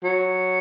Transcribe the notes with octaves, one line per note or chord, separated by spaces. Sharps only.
F#3